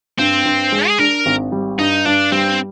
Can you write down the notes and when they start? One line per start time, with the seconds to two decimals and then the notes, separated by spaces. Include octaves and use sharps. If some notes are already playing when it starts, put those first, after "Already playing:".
0.19 G2 C4
0.45 G2
0.72 G#3
0.88 G#4
0.99 D4 A#4
1.26 G#1
1.52 G3
1.78 G2 D#4
2.05 G2 D4
2.32 G3 C4